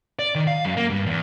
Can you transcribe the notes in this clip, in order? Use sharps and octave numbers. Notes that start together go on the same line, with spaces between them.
D5
D#3
F5
F#2
A#3
G2
E2